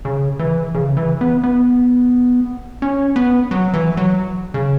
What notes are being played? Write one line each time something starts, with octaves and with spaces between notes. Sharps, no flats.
C#3
E3
C#3
E3
B3
B3
C#4
B3
F#3
E3
F#3
C#3